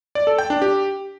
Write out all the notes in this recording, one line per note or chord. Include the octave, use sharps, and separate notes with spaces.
D5
A4
G5
D4
G4